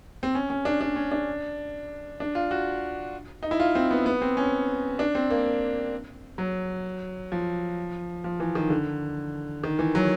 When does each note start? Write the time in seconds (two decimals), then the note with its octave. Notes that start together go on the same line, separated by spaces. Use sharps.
0.23 C4
0.35 C#4
0.50 C#4
0.65 D4
0.81 D4
0.96 C#4
1.12 D4
2.20 D4
2.35 F4
2.51 F#4
3.43 D#4
3.51 E4
3.60 F4
3.75 C4
3.91 B3
4.06 B3
4.22 C4
4.37 C#4
4.99 D4
5.15 C4
5.30 A#3
6.38 F#3
7.32 F3
8.24 F3
8.40 E3
8.55 D#3
8.70 D3
9.63 D#3
9.79 E3
9.95 F#3